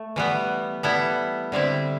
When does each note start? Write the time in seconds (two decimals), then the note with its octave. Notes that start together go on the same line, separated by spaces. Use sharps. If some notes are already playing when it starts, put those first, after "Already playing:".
Already playing: A3 A4
0.16 E3 G3 B3
0.83 G3 B3 E4 A4
1.52 D3 G3 C4 E4